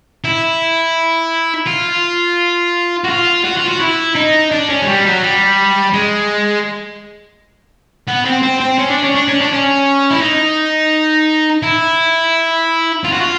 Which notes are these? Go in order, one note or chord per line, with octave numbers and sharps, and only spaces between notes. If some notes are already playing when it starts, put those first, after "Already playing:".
E4
F4
F#4
F4
F#4
F4
F#4
E4
D#4
D4
C#4
G#3
G3
F#3
G3
G#3
B3
C4
C4
C4
C#4
D4
C#4
D4
C#4
D4
C#4
E4
D#4
E4
F4
F#4
F4